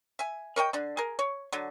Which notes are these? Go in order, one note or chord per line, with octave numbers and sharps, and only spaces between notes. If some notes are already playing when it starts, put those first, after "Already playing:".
E5 G#5
A#4 C#5 D#5 G5
D3 D4
G#4 A#4
C#5
D3 F#3